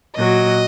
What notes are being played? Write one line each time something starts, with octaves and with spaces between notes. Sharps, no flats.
A#2 F#3 D#5